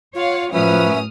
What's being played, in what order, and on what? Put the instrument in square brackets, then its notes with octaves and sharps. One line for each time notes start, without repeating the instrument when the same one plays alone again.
[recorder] F4 [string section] C#5 F5 F#5
[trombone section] F#2 C#4 B4 [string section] A2 D#6 F6 [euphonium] F3 [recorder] E5